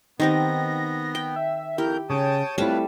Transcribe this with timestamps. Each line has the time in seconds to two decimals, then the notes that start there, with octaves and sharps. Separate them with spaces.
0.20 D#3 B3 C4 D#4 G4 A#6
1.15 G5
1.36 E5
1.78 F2 E4 G4 A#4 G6
2.10 C#3 C#5 G5 A5 D#6
2.58 F2 G3 A3 C4 E4 F4 B4 A5